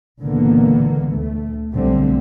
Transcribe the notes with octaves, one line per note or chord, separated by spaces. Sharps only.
C#2 A#2 D3 E3 A#3 B3
D2 A3
B1 D3 G3 A3 C4